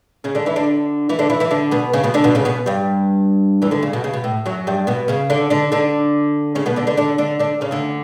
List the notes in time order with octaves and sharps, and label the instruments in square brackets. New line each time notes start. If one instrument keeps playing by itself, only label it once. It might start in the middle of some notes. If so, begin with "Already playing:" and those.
[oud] C#3 C#4
D3 D4
E3 E4
D3 D4
E3 E4
D3 D4
E3 E4
E3 E4
D3 D4
B2 B3
C#3 C#4
B2 B3
D3 D4
B2 B3
C#3 C#4
B2 B3
G2 G3
E2 E3
D2 D3
C#3
B2
C#3
B2
A2
F#2 F#3
G2 G3
B2 B3
C#3 C#4
D3 D4
D3 D4
D3 D4
C#3 C#4
B2 B3
D3 D4
D3 D4
D3 D4
D3 D4
D3 D4
C#3 C#4
D2 D3